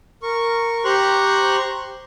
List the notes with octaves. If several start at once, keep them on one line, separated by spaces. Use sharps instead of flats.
A#4 C#6
G4 C5 A#5 C6 C#6 F#6